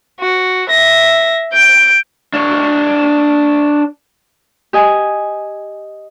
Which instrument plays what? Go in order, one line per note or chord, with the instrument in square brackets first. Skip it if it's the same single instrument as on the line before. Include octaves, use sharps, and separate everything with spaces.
[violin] F#4
E5 A#6
G6 D7
[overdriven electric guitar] D4 C#5
[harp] G4 D#5 G#5